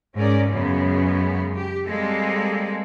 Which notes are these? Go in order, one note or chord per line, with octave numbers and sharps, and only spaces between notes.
G#2 C#4 A#4 D5
F#2 C#3 G#3 B3
G4
G3 G#3 A#3 C4 A4